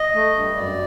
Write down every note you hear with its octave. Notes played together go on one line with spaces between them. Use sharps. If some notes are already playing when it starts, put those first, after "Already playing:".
Already playing: D#5
A3
G2
F#2 D5